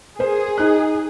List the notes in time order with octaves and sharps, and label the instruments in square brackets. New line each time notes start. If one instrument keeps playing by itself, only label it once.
[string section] G#4 [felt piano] A#4 C5
[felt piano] D#4 F#6